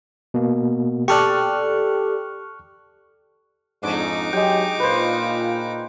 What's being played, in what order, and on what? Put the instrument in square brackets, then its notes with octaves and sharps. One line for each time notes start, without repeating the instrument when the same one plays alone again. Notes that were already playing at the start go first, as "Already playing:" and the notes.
[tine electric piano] B2 A#3
[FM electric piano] G4 A4 D5 [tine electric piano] C#6 F6 F#6
[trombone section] F2 G#2 [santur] D4 C#5 D5 [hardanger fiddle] D#4 D6
[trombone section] F#3 G4 [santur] G#3 G5
[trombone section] A#2 F4 [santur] B4 C5